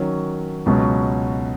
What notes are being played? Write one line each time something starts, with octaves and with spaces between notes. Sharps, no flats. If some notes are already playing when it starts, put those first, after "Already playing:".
Already playing: D#3 F#3 C#4
C#2 B2 F#3 C#4 F#4